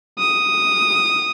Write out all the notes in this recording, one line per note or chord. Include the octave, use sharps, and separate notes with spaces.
D#6